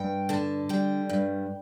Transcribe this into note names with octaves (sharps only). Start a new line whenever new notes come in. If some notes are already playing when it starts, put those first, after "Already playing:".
Already playing: G2 G5
D3 A5
G3 G5
G2